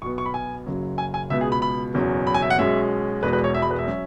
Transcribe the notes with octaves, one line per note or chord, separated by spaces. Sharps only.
B1 B2 B3 C#6
C#6
B5
G#5
F#1 F#2 C#3 F#3
G#5
G#5
C#2 B2 B3 E5
G#4
B5
B5
F#1 E2 B2 F#3 C#4
B5
G#5
E5
F#5
B1 B2 G#3 C#4 E5
E1 E2 B2 G#3 B4
B4
C#5
E5
B5
B4
E5
F#3 C#4